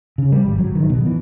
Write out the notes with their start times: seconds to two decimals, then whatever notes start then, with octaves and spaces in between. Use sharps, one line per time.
0.18 C#3
0.32 G3
0.46 G#1
0.58 F#3
0.75 D#3
0.90 B2
1.06 E3